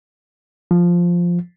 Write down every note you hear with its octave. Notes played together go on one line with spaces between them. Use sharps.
F3